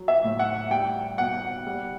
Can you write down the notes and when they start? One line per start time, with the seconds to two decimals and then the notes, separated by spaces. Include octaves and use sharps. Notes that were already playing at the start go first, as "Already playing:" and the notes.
Already playing: F#3
0.08 E5
0.24 A2
0.39 F#5
0.70 G3 G5
1.18 B2 F#5
1.67 G3